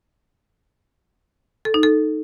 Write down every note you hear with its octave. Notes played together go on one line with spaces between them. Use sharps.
A4
D#4
A4